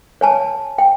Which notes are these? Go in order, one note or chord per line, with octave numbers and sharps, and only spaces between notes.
C#5 G#5 A5
G5